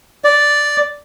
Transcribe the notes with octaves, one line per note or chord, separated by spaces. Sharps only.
D5